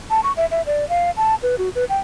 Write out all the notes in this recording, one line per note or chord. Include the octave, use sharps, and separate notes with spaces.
A5
C#6
E5
E5
D5
F5
A5
B4
F#4
B4
G5